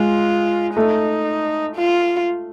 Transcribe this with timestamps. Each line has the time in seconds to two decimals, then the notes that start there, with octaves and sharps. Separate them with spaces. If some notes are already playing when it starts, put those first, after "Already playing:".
Already playing: G#3 F4
0.76 A3 D#4
1.76 F4